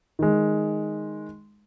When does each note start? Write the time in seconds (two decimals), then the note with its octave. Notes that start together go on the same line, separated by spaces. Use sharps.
0.19 D#3 G#3